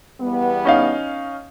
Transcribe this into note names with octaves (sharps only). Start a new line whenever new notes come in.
E2 G3 B3
C#4 D#4 F5